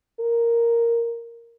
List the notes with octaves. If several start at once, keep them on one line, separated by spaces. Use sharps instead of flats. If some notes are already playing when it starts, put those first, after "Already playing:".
A#4